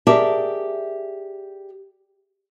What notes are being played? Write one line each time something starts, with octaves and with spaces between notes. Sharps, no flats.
G4 G#4 A#4 D5 E5 A5